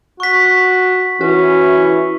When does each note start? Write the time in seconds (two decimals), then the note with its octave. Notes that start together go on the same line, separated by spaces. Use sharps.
0.20 F#4 C#6 B6
1.21 E3 C#4 F#4